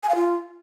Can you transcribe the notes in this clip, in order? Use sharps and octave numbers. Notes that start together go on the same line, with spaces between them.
G#5
F5
F4